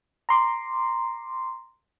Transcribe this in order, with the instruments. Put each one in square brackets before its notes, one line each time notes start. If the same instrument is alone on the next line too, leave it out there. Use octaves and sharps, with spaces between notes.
[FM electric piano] A#5 C6 D6